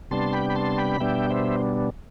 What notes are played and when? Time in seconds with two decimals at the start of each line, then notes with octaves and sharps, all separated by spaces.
0.11 C3 G3 B3 D4 A5 C6
0.33 G5 B5
0.50 B5
0.56 A5 C6
0.78 G5 B5
1.00 B2 G3 B3 D4 E5 G5
1.30 C5 E5